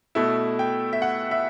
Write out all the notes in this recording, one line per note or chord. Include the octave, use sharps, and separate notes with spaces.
B2 A3 E4
G5
E5
F#5
E5